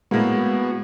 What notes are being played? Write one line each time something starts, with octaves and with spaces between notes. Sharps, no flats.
A2 G#3 A#3 B3 F#4